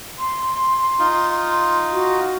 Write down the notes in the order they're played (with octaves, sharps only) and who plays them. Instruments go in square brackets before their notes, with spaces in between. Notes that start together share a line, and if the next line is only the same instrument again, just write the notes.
[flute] C6
[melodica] D#4 F4
[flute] F#4